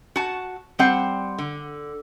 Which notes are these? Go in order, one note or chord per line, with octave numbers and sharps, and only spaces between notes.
F#4 A5
G3 C4 F#5
D3